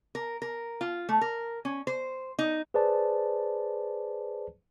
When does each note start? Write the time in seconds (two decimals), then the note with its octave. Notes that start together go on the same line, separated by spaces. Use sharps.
0.15 A#4
0.42 A#4
0.81 F4
1.09 A3
1.21 A#4
1.65 C#4
1.87 C5
2.39 D#4
2.74 G#4 B4 C5 D5 A5